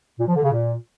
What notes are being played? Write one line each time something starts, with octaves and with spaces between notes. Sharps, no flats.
A#2
F3
D3
C#3
A#2